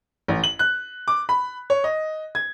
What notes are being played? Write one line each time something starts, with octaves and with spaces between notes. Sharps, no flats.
A1
F#7
F#6
D6
B5
C#5
D#5
G#6